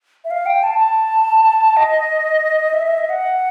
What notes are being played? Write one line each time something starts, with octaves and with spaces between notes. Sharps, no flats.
E5
F5
G5
A5
A5
D#5
E5
E5
D#5
F#5